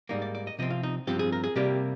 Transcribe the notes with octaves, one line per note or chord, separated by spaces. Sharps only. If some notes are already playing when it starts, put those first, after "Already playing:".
G#2 G3 A#3 D#4
D5
D5
D#5
C3 F3 C4 D#5
F4
D#4
G2 F3 C4 G4
G#4
A#4
G#4
C3 G3 A#3 G4